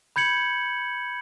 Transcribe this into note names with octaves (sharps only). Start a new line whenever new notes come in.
B5 G6 G#6 C#7 F#7